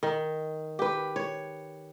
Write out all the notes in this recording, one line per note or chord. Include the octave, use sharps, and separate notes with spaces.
D#3
G4 B4
C#5